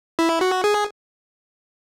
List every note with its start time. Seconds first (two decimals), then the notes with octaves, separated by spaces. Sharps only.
0.19 E4
0.41 F#4
0.64 G#4